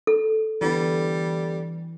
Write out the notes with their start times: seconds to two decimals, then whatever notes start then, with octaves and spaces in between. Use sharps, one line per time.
0.07 A4
0.61 D3 E3 G3 B3